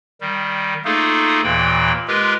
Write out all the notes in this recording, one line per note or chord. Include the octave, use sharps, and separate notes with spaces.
D#3 G3
A3 A#3 D#4 F4 G#4 A4
D#2 A#2 E3 G5 B5
G#3 F4 G4 A#4 B4